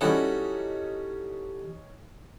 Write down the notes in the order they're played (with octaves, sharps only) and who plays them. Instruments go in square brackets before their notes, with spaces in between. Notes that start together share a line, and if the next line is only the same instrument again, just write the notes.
[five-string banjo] G3 E4 D#5 [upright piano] C#4 D#4 [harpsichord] F#4 A4